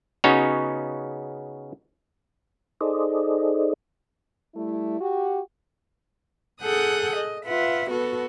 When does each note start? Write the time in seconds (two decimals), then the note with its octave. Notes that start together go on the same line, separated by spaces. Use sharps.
0.24 C#3 B3 C#4 D#4 F#4 C#5
2.81 D#4 G#4 A4 C5 D5 D#5
4.55 G3 A3 E4
5.00 F#4 G4
6.62 G#4 A4 F#5 D#6 F#6 G6
7.16 D#5
7.46 F4 B4 E5 F#5
7.88 B3 F#4 A4 B4